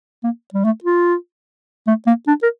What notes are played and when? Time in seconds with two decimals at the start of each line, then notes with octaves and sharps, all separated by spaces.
0.24 A#3
0.54 G3
0.64 A3
0.84 F4
1.87 A3
2.07 A#3
2.27 D4
2.43 A#4